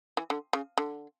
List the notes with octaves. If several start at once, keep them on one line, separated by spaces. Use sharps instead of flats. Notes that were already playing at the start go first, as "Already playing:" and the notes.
E3
D3
C#3
D3